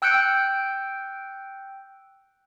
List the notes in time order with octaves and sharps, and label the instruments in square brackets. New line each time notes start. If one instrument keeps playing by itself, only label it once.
[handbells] G5 E6 F#6 G6 C#7 D7